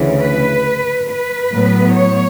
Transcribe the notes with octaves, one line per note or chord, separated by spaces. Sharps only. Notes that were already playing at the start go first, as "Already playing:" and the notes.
Already playing: D2 C#3 E3
B4
B4
A2 F#3 B3
C#5